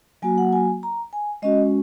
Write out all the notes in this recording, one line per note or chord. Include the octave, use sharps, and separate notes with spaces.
F#3 A#3 F#4 G#5
F#5
G#5
A#5
G#5
G#3 C#4 F#4 D#5